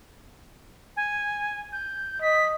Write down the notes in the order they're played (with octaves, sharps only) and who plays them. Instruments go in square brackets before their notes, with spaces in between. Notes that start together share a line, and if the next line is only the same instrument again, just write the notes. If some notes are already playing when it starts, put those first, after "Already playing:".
[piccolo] G#5
G6
[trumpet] D#5 [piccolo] B6